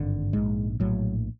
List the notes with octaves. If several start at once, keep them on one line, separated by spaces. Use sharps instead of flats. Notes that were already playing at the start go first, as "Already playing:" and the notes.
Already playing: G#1 G2 D3
A#1 G#2 G#3
A#1 A2 F#3